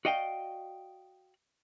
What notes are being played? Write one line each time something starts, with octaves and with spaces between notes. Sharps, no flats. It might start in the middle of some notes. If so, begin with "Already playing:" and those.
F#4 D5 D#5 F5 G5